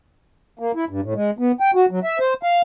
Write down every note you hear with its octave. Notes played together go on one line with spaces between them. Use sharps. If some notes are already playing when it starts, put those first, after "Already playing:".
A#3
E4
G2
A2
G#3
B3
G5
F#4
F#3
E5
C5
F5